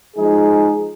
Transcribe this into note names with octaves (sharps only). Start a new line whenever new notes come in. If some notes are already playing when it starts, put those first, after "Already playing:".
F3 G#3 D#4 G#4